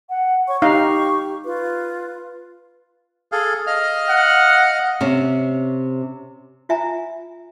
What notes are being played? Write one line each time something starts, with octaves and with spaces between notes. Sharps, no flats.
F#5
C#5 C#6
D#4 G4 F5
F4 B4
G#4 A4 F5
D#5 F5 F6
F#5
C3 C#4
F4 E5 G#5 A#5